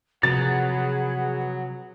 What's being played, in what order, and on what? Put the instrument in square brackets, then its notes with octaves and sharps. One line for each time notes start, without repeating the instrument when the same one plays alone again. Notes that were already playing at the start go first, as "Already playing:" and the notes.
[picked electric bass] C3 F3 [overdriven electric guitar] F#3 [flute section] G#4 B4 F#5 [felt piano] A6